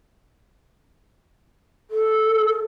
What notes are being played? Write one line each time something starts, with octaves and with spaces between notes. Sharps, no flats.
A4